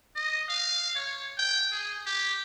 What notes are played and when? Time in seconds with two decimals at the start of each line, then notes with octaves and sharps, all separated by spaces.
0.16 D#5
0.49 F5
0.95 C#5
1.38 G5
1.71 G#4
2.06 G4